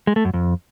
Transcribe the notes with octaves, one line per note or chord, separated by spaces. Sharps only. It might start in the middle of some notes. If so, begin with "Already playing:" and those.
G#3
A3
F#2
F2